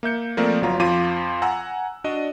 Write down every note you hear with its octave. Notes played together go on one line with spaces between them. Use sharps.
A#3 E5 G6 C#7
F3 A3 A#3 C4 A#4 D5
G1 F#3 F4 A#5
F2 F3 F4 D6 D#7
F#5 G#5 A#5 E6
D4 F#4 D5 D#5